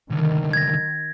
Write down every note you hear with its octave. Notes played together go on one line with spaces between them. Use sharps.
C2 D3 D#3
G#6 A#6